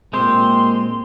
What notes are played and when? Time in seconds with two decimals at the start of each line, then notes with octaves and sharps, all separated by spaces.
0.13 A#2 G#3 C4 G4 C6